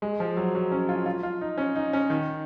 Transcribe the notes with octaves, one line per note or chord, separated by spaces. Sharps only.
G#3
F3
F#3
F#3
C#4
F4
F4
F4
D#4
C#4
D#4
C#4
D#3